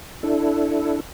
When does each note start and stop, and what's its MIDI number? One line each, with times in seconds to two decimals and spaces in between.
0.23 1.00 62
0.23 1.00 64
0.23 1.00 69